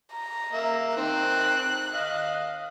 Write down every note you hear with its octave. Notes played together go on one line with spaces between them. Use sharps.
A#5
A#3 E5
D#3 C4 F#6
D#5 F5